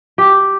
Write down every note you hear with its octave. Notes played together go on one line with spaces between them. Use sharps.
G4